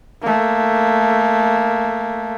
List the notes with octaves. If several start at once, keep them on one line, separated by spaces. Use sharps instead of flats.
A3 A#3